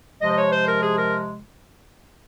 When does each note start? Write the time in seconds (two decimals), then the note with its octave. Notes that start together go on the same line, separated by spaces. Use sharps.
0.20 C3 F3 G#3 D#5
0.28 C5
0.36 C#5
0.51 C5
0.66 A#4
0.82 G#4
0.97 A#4